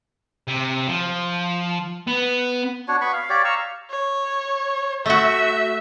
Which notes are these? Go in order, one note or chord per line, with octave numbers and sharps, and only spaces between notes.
C3
F3
B3
D4 F#4 C#5
B3 B5 C#6
F5
G4 C#5 D5
F5 A#5 C#6 E6
C#5
A3 F#4 E5